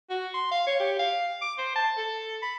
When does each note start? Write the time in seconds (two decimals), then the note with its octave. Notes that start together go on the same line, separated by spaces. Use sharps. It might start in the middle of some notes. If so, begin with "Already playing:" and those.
0.10 F#4
0.34 C6
0.51 F5
0.67 C#5
0.80 G4
0.99 F5
1.42 D6
1.58 C5
1.76 A5
1.98 A4
2.42 B5